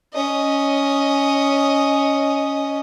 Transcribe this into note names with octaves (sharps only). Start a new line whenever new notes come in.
C#4 D#5